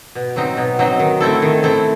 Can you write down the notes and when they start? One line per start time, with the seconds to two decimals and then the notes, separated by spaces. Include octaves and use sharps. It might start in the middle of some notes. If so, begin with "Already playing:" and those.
0.15 B2
0.36 F#3 C4 D#4
0.57 B2
0.79 F#3 C4 D#4
0.99 D#3
1.20 A3 C4 E4 A4
1.42 D#3
1.63 A3 C4 E4 A4